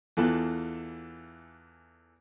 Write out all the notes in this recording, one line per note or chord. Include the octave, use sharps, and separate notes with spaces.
E2 E3 F4 A4 F#6